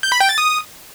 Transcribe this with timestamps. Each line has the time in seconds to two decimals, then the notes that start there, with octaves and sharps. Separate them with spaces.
0.03 G6
0.12 B5
0.20 G5
0.29 A6
0.38 D#6